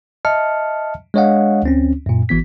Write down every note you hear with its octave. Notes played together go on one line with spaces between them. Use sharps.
D#5 E5 A5 F6 C#7
G#3 D4 C#5 D#5 F5 F#5
D2 C4 C#4
F#2 A#2
G#1 E3 B3 B6